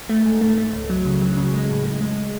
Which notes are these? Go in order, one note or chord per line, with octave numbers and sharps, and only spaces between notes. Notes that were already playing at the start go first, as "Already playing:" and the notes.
A3
G#2
A3
A3
C#2
F#3
C#3
F#3
C#3
G#3
A2
G#3
G#3